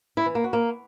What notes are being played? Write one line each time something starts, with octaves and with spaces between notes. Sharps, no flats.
E4
E3
A#3
F#4
A#3